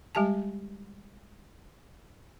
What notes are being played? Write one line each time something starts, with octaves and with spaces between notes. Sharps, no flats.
G3 G#3 G4 G#5 A5